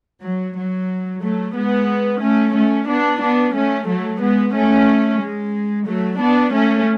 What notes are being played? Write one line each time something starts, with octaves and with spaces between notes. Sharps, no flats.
F#3
F#3
F#3 A3
G#3 B3
A3 C#4
A3 C#4
B3 D4
B3 D4
A3 C#4
F#3 A3
G#3 B3
A3 C#4
G#3
F#3 A3
B3 D4
A3 C#4